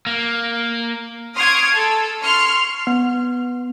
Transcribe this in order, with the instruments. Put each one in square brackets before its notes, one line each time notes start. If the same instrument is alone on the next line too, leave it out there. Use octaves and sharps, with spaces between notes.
[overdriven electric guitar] A#3
[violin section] C6 C#6 D#6 F6 G#6 D7
A4
C6 C#6 F6
[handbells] B3